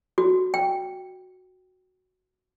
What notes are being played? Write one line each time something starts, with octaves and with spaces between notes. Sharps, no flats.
F#4
G5